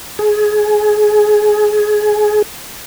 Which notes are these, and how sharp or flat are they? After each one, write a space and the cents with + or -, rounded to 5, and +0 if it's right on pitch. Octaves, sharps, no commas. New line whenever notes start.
G#4 +20